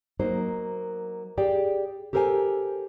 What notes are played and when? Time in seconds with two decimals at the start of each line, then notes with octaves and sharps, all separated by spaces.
0.19 F#3 A#3 D#4 C5
1.38 G4 G#4 D5 G5
2.13 G4 A4 A#4 C5 F#5 G#5